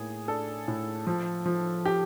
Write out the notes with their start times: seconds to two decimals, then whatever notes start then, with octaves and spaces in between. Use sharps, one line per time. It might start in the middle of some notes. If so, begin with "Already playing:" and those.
Already playing: A2 A#3 G#4
0.28 D4 A4
0.68 A2
1.07 F3
1.46 F3
1.86 G4